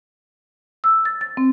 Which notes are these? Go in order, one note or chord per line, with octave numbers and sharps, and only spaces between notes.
E6
A6
A6
C4